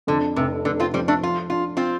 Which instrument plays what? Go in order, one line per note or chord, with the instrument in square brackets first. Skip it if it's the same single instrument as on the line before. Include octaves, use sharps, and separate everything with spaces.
[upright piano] F2 [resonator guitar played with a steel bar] D3
[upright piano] F1 [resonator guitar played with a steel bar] C3
[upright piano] F1 [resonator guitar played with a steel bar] D3
[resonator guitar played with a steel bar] C4 F4
[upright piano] F3 [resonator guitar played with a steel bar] G3 C4
[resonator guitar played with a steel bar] A3 D4
[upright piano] F3 [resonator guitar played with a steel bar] F4
[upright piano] D4 [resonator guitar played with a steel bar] F4
[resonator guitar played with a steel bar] C4 F4